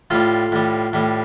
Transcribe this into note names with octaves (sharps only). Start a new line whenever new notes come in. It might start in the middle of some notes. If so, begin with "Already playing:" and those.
A2 G3 F4 A4
A2 G3
A2 G3